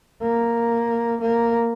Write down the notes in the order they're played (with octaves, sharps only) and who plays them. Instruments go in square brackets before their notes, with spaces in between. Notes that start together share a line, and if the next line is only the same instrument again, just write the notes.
[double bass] A#3
A#3